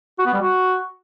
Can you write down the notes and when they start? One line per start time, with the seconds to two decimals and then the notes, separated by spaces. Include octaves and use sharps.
0.19 F#4
0.26 B3
0.34 G3
0.41 F#4